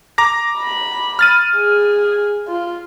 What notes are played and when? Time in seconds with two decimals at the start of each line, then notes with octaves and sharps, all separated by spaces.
0.18 A#5 D6 A#6
0.59 B5
1.19 F6 A6 D#7
1.56 G#4
2.48 F4